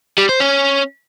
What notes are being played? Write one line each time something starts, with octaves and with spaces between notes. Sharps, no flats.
G3
C5
C#4